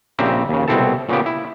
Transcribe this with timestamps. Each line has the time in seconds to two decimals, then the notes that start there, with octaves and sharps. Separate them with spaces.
0.19 A#1 C#3 C4 G4 E5 A#5
0.49 D#2 C#3
0.68 C2 B2 C4 E4 A4 A5
1.09 A#2 C#3 B3 G4
1.26 E4